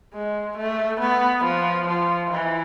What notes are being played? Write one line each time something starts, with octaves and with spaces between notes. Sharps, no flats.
G#3
A3
B3
F3
F3
E3